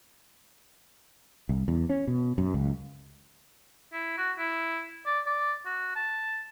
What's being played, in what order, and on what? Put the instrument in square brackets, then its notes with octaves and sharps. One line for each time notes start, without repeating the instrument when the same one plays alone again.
[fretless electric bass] C2
E2
C#4
B2
F#2
C#2
[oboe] E4
F#4
E4
D5
D5
F#4
A5